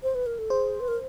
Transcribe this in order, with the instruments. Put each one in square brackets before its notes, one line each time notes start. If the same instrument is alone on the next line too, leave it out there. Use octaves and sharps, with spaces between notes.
[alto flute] C5
B4
A#4
A4
[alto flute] G#4 [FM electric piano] C5
[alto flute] B4
A#4